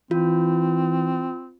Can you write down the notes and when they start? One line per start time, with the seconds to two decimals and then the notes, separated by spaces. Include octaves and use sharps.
0.11 E3 C4 F4